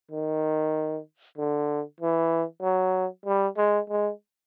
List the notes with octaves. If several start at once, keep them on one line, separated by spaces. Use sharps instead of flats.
D#3
D3
E3
F#3
G3
G#3
G#3